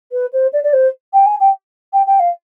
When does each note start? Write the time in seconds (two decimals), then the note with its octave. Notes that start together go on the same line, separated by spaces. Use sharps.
0.12 B4
0.33 C5
0.53 D5
0.64 D5
0.73 C5
1.13 G5
1.26 G#5
1.40 G5
1.93 G5
2.07 G5
2.20 F5